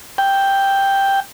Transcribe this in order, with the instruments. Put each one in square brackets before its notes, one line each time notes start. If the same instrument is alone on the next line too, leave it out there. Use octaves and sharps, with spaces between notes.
[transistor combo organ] G5